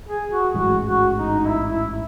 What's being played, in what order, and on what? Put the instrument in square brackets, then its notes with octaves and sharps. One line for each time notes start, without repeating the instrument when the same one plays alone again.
[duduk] G#4
F#4
[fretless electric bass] A1 G#2 E3 G#3 [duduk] F#4
[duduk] F#4
D#4
D#4
E4
E4